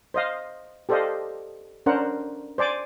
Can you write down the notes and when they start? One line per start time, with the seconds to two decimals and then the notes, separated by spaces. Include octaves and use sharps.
0.14 C5 D#5 F5
0.89 G4 A4 C5 D5 D#5 F5
1.86 C#4 D4 A#4 C5 F#5
2.58 C5 D5 G#5 D6